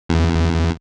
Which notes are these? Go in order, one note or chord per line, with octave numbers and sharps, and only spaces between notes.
E2